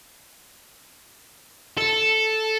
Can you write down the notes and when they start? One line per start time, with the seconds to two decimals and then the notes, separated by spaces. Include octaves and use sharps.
1.77 A4